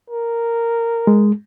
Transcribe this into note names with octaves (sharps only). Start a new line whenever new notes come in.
A#4
G#3